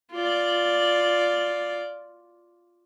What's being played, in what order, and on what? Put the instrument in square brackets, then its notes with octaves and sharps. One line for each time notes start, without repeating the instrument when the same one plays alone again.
[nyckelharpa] F4 D5